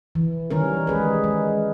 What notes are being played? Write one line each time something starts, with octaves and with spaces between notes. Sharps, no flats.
E3
D#3 G3 C#4 A#4
G#3 G#4 B4
G#3